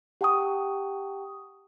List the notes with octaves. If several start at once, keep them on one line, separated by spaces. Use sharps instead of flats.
G4 F#5 G5 A5 C#6 D#6